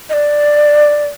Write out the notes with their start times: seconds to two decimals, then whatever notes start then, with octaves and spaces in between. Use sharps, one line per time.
0.10 D#5
0.13 D5